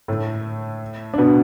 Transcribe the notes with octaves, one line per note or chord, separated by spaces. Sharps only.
A2 A3
D4
B2 B3